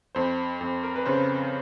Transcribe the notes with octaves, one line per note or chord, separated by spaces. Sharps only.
F2 C5
F2
A#4
B4
C#3 C5